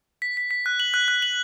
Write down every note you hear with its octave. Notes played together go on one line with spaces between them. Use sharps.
B6
B6
B6
F#6
F#7
F#6
F#6
F#7